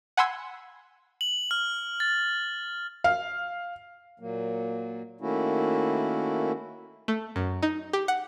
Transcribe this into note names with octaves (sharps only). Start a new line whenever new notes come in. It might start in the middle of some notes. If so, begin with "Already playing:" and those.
F#5 G#5 B5 C6 E6 G#6
F#7
F6
A6
F5
A#2 F#3 A#3
D#3 A3 A#3 C#4 E4 F#4
A3
F#2
D#4
G4
F#5